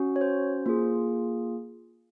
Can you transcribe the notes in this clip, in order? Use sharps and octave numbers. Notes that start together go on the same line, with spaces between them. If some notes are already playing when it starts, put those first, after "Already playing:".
Already playing: C#4 F#4
C#5
C5
A#3 F4 G#4